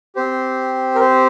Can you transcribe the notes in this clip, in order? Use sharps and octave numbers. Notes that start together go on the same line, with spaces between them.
C4 G4 C5
A#4
C5